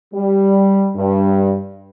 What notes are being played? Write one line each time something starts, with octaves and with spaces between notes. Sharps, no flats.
G3
G2